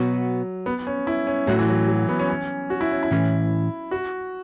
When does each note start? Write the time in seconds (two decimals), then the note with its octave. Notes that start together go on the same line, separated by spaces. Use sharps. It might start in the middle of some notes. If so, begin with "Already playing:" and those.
Already playing: B2 F#3 B3 F#4
0.66 B3
0.87 C#4
1.07 E4
1.27 C#4
1.47 A2 F#3 A3 F#4
1.59 E3
1.68 F#3
1.88 F#3
2.09 B3
2.19 C#4
2.30 C#4
2.70 F#4
2.81 E4
2.91 C#4
3.03 E4
3.11 A2 E3 C#4
3.91 F#4